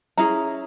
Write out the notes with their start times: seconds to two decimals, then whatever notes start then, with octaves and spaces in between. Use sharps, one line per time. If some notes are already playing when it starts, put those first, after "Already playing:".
0.17 C#4 E4 G#4 A#5